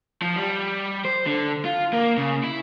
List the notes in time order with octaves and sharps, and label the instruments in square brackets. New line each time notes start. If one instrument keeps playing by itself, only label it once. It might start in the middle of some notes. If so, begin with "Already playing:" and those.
[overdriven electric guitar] F3
G3
C5
D3
F4
A#3
C#3
E4